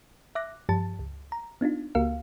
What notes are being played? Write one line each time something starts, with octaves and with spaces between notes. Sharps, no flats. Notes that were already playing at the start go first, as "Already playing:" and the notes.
E5 D6 F#6 A#6
G2 F3 G4 A5 A6
C#2
A#5
B3 D4 D#4 F4
C#2 A#3 F#4 G4 A#4 F5